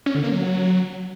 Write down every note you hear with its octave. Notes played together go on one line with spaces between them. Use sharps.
C#4
D3
A#3
F#3